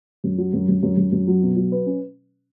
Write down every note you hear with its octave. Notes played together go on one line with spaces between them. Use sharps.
F#2
F#3
F#2
F#2
F#2
F#2
F#2
F#3
B2
F#3
B4
C#4